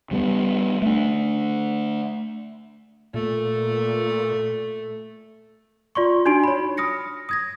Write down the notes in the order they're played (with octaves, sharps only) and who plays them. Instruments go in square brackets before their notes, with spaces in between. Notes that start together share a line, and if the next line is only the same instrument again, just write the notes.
[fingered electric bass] C#3 G3 A3 B3
A3 D4
[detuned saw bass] A#2 [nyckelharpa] A3
[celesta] F4 D5 C6 C#6
D4 D#4 F#4 G#5 C6 D7
C#5 B5
D#6 F6 A#6 C#7
D#6 G#6 A#6